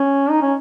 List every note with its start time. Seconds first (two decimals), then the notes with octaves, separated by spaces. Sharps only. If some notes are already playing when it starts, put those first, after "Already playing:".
Already playing: C#4
0.30 D#4
0.42 C#4